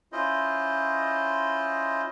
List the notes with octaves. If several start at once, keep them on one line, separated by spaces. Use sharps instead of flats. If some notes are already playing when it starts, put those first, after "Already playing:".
C#4 E4 F4 C5 D#5